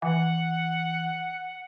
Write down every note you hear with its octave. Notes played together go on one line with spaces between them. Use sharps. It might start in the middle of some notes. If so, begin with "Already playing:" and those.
E3 F#5